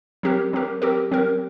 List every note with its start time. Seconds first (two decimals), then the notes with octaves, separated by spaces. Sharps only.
0.23 F#3 C4 G4 A#4
0.53 F#3 C4 G4 A#4
0.82 F#3 C4 G4 A#4
1.11 F#3 C4 G4 A#4